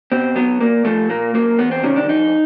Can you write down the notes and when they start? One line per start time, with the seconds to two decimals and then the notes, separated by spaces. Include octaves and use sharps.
0.12 B2 C4
0.36 F#3 B3
0.61 A#2 A#3
0.85 F3 A3
1.10 A#2 A#3
1.34 F#3 A#3
1.58 E2 B3
1.71 C4
1.83 C3 D#3 F#3 C#4
1.96 D4
2.08 F2 D#4